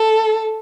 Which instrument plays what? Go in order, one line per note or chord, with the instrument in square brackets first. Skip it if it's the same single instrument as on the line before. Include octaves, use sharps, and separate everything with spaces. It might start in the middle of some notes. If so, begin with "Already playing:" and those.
Already playing: [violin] A4